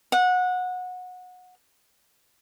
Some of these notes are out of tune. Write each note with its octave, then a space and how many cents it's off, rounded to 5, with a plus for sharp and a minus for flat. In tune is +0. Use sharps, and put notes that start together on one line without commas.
F#5 -20